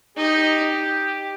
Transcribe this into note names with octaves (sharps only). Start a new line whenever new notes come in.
D#4 G4